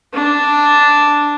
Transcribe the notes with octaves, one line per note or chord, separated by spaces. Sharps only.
D4